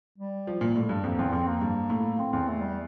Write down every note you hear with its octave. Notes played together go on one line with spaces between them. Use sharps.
G3
F3
A#2
A2 G3
G2
F2 A#3
E2 C4
F2 C4
A#3
G2
A2
A2 C4
E2 C4
A3
G3